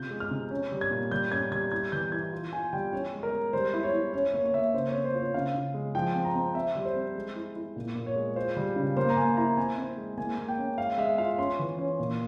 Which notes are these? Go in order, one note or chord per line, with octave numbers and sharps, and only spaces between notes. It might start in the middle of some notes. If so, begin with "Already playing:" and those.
Already playing: C3 F4 G6
G#3
F6
C3
C#4
G3
G#6
A#2
G3 G6
C#4 G#6
G3 G#6
E4 G#6
E3 G6
E4 G#6
F4
F4 G#5
G3 G5
C#4 C#5
G#3
A#4
G#3
G3 C5
E4
C#5
E4
C#4 C#5
A#3 C#5
C#5
A#3 E5
C#3 C5
C#5
C4
C5
F4
C#5
C#3 F5
C#3
G#3
F3 G5
C4
A#5
C4
C4 E5
G3
C5
C4
G#3
E4
E4
A#2
A#2
C#5
G#3
F4 C5
G3
C#3
A#3 C5
A#5
A#3 G#5
E4 A#5
C4 G#5
C4
G#3
A#3 G#5
A#3
G5
C#4
G#3 F5
G#3 E5
F4 F5
C#4 C6
E3
C#4
A#2